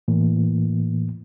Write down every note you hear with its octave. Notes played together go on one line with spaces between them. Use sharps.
A2 E3 A#3